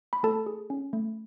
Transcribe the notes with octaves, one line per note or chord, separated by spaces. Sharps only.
B5
A3 A4 A5
G#4
C#4
A3